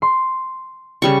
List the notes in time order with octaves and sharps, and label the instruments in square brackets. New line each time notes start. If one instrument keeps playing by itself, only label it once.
[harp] C6
[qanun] C#3 G3 C#6